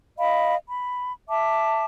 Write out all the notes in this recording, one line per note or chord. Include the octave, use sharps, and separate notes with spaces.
D#5 F5 B5
B5
E5 A5 D6